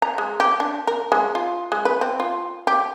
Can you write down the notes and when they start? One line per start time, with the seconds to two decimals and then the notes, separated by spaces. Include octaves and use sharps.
0.02 A#5
0.18 G#3
0.40 G4
0.60 D4
0.87 A#4
1.12 G#3
1.35 F4
1.72 G#3
1.85 B4
2.01 C4
2.20 F4
2.67 G4